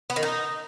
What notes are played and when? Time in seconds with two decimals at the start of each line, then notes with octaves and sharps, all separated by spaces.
0.10 B3
0.16 D#3
0.23 D#4